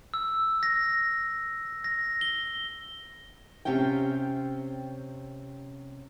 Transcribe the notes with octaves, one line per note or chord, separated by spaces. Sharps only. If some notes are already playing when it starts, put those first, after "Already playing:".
E6
A#6
A#6
G7
C3 C#4 F4 G5